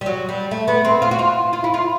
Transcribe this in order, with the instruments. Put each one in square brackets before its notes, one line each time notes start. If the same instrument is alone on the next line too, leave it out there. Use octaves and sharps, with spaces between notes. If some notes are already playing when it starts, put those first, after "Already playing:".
[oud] G3
F#3
G3
A3
B3
C4
F4
F#4
F4
F4
E4
F4